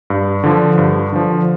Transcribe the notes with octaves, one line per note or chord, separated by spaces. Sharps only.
G2
D3 F3
G2
D3 F3